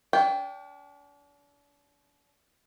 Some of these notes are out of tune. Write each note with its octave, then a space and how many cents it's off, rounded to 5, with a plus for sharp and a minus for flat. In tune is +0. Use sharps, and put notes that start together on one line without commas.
D4 -40 G5 +0